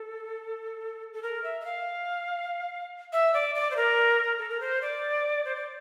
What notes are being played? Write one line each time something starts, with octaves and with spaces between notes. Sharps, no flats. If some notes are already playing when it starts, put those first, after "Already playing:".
Already playing: A4
A4
A#4
E5
E5
F5
E5
D5
D5
C5
A#4
A4
A#4
C5
D5
C5
D5